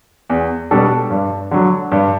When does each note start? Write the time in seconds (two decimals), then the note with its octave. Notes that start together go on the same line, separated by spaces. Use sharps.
0.30 E2
0.71 B2 G3 D4 A4
1.10 G2
1.51 D3 F#3
1.92 G2